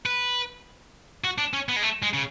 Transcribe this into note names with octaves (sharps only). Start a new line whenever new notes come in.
B4
F#4
D4
C#4
B3
G#3
A3
G#3
C#3